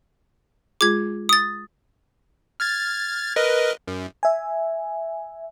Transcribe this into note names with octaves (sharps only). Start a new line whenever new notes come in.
G#3 F4 G#4 D6 G#6
D#6 A6
F6 G#6 A6
A#4 B4 D#5
F#2
E5 G#5